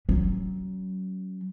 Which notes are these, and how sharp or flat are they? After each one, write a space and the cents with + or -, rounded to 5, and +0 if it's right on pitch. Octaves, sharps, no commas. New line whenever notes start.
F#3 +20 C#4 +0